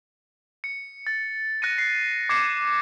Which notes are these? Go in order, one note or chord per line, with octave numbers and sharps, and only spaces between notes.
C#7
A6
F#6 A#6 C#7 D#7
C7
D6 G#6 C7 C#7 E7